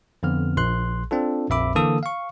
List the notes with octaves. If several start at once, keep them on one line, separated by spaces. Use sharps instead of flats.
F2 D3 B3 F6
A#1 C6 F#6
C4 D4 F4 A4
A#1 F2 E5 B5 D6
D3 E3 A#3 A4 D#6 E6
F5 C#6